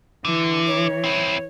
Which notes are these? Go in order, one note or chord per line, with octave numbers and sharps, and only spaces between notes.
D3 E3
C#5
C4 E4